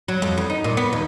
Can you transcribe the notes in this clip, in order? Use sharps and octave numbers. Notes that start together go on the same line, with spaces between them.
F#3
F2
E2
D#4
A#2
B3
D#2